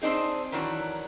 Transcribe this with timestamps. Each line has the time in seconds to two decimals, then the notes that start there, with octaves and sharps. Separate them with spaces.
0.02 C4 D4 D#4 G#4
0.52 D#3 E3 F#3 D4